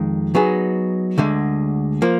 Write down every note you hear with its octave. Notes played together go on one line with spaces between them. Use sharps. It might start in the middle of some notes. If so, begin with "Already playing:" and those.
Already playing: F2 D#3 G#3
F#3 B3 D#4 G#4
D2 D3 G#3
F3 A#3